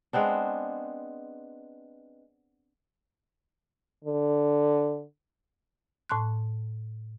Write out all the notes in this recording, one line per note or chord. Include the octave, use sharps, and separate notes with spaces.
G#3 B3 C4 D4
D3
A2 A5 C6 F#6